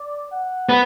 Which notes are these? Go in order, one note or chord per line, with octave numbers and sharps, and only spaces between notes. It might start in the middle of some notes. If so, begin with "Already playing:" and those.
Already playing: D5
F#5
B3